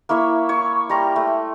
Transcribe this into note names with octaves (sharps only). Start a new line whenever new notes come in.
A#3 E4 C#5 E5
C#5 C#6
G3 A#5 C6
A3